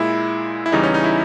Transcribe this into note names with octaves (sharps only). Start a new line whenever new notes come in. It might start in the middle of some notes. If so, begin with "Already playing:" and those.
Already playing: A#2 G#3 E4
E4
E2 C#3 E3 G3 D#4
C#4
D#4
E4